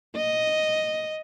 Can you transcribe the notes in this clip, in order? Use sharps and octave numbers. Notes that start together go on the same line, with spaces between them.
D#5